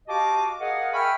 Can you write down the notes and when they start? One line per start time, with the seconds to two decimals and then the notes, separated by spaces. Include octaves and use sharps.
0.08 F#4 G4 D#5 F5 A5 D6
0.59 G#4 A#4 D#5 F5 F#5
0.93 E5 G5 G#5 B5 C#6 F6